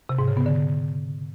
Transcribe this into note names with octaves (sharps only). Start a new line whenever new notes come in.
C3
G#2
C#3
B3
D3